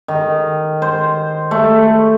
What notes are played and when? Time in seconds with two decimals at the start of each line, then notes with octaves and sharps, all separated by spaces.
0.08 D#3
0.82 C5
1.51 A3